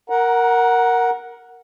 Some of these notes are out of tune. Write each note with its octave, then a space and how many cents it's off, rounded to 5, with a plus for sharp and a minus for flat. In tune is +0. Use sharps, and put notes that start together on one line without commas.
A#4 +0 F#5 +0 A#5 +25